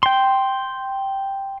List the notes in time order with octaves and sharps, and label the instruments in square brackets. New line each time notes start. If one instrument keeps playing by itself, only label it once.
[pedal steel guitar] G5 C6